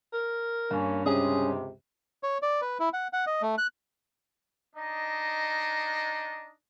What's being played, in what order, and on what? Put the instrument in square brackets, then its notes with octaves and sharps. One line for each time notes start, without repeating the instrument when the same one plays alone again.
[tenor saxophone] A#4
[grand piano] G2 [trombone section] A#3 C#4
[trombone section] C#2 C3 [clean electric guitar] C#4 [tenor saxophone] G#4
[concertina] C#5
D5
B4
E4
F#5
F#5
D#5
A3
F#6
[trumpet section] D4 D#5 [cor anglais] D#4